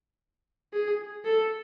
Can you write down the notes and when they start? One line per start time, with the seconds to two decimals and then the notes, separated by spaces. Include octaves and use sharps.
0.74 G#4
1.25 A4